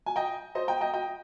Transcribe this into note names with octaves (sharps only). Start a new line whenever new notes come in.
G#5
D#5 G5
C5 D#5
D#5 G5
D#5 G5
D#5 G5